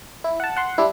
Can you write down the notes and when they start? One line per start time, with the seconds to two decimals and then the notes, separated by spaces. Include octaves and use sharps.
0.24 E4
0.40 F#5 A5
0.57 F#5 C6
0.78 G3 D4 E4